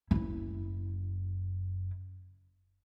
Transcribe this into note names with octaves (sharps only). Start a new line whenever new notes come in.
F#1 E4